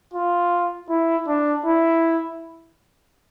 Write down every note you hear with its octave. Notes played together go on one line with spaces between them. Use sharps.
F4
E4
D4
E4